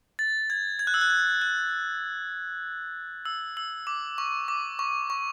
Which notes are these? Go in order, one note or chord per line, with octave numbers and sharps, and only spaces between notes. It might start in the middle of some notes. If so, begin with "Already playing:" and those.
A6
G#6
G#6
F#6
E6
F#6
G#6
F#6
E6
E6
D6
C#6
D6
C#6
C#6